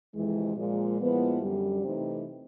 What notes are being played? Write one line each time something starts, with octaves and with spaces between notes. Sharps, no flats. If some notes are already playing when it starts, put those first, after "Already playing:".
F2 C3 E3 G#3
A#2 F3 G#3
A#2 F3 G#3 B3 E4
F#2 D3 G3
C3 E3 A3 C4 D#4